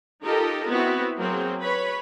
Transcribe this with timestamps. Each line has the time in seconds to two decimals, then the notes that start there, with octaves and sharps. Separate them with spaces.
0.24 D#4 F4 G4 A4 A#4 D#5
0.69 B3 C4 E4 F#4
1.19 F#3 A#3 C4 G#4
1.62 B4 C#5 B5